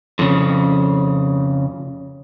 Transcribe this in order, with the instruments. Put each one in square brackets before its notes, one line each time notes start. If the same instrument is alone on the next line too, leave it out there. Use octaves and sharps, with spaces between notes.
[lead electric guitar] F2 C#3